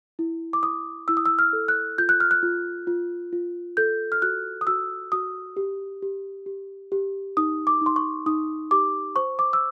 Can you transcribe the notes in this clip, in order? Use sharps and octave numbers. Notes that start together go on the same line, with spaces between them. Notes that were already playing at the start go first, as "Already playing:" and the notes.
E4
D6
E4 D#6
E4 E6
D#6
E6
F6
A4
F#6
F4 G6
F#6
F6
F#6
F4
F4
F4
A4 G6
F6
F#4 F#6
D#6
F#4 E6
F#4 D#6
G4
G4
G4
G4
D#4 D#6
D6
D#4 C6
C#6
D#4 D#6
G4 D6
C5 C#6
D6
E6